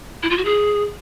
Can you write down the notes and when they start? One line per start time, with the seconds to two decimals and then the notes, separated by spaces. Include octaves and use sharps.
0.23 E4
0.30 F4
0.38 F#4
0.45 G#4